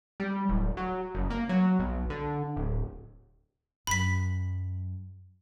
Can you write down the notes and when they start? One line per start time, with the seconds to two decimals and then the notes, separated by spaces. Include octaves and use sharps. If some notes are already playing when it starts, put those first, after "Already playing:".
0.20 G3
0.49 D1
0.77 F#3
1.14 F#1
1.30 A#3
1.49 F#3
1.79 B1
2.10 D3
2.57 D1
3.87 F#2 B5 B6